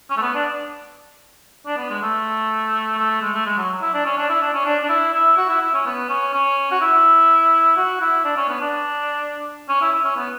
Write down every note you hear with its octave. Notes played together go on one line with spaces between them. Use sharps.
C#4
A3
B3
D4
D4
B3
G#3
A3
A3
G#3
A3
G#3
F#3
E4
D4
C#4
D4
E4
D4
C#4
D4
D4
E4
E4
F#4
E4
E4
C#4
B3
C#4
C#4
F#4
E4
F#4
E4
D4
C#4
B3
D4
C#4
E4
E4
C#4
B3